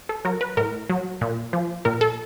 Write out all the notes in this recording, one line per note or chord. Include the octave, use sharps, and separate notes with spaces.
A4
F#3 A#4
B4
A2 A#4
F#3
A#2
F3
A#2 A#4
A4